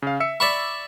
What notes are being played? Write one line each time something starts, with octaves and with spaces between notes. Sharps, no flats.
C#3 F5
E5 E6 C#7
D5 E5 B5 C#6